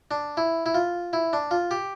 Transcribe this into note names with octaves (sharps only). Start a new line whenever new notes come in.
D4
E4
E4
F4
E4
D4
F4
G4